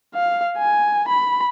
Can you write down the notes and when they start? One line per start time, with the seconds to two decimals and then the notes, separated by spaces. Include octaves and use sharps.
0.15 F5
0.58 G#5
1.09 B5